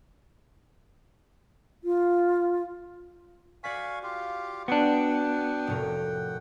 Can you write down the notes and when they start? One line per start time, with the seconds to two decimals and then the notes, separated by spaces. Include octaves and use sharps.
1.84 F4
3.64 F#4 D5 F5 G#5 C#6 B6
4.03 F4 G4 F5
4.68 B3 D4 F#4 F#5 G5
5.67 F1 A2 A#4